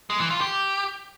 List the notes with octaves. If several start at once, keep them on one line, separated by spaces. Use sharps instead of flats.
G#3
E3
F4
G4